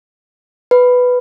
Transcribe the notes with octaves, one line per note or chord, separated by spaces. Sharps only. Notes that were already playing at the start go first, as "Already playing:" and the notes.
B4